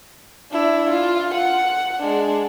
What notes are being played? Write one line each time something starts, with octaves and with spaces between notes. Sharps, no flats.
D4 E4
F4
F#5
G#3 D4